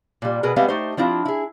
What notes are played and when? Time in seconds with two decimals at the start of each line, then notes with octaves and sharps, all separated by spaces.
0.22 A#2 G3
0.43 B2 G#4 A#4 B4
0.56 G3 G#3 B3 C4 E5 F5
0.68 A3 D#4 G4 C5
0.97 F3 C4 D4 E4 F4
1.25 E4 G#4